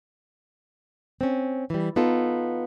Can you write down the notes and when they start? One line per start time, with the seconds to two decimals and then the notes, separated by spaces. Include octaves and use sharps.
1.21 C4 C#4
1.70 E3 G3
1.96 B3 D#4 F4 A4